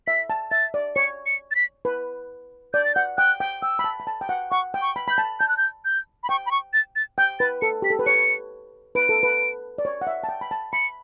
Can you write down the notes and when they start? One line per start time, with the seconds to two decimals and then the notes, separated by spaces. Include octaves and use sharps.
0.07 E5 B6
0.30 A5
0.51 E5 A6
0.74 D5
0.96 C#5 C#7
1.26 C#7
1.51 A6
1.55 B6
1.85 B4
2.73 D5 G6
2.85 A6
2.95 F#5 G6
3.18 G5 F#6
3.40 G5
3.62 G5 E6
3.79 B5
3.84 A5
4.00 B5
4.07 A5
4.21 G5
4.29 F#5
4.51 F#5 C#6
4.74 G5
4.82 C#6
4.96 B5
5.08 B5 G6
5.18 A5
5.40 A5 G6
5.49 F#6
5.57 G6
5.85 G6
6.23 B5
6.29 G5 C#6
6.46 B5
6.51 C#6
6.73 A6
6.96 A6
7.18 G5 G6
7.40 B4 A6
7.62 A4 C#7
7.82 G4 B6
7.90 A4
7.99 B4
8.06 C#5 C#7
8.95 B4 D7
9.09 A4
9.23 B4
9.78 D5
9.85 C#5
10.01 F#5
10.07 E5
10.24 A5
10.29 G5
10.41 B5
10.51 A5
10.73 B5 C#7